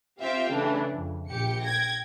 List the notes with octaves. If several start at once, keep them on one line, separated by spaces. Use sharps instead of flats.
C4 F4 G4 E5 F5 G5
C#3 E3 A3 D4
F2
A#1 G4 C#7
G5 G#6 A#6